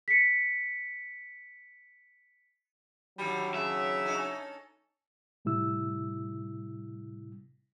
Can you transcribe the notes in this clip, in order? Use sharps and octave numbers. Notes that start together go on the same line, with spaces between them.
B6 C#7
A2 D3 D#3 F#3 G3
C#3 E5
C#4 D#4 A4
A2 C3 G3 E4 E6